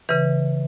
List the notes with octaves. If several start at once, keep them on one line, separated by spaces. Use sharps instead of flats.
C#3 E3 B4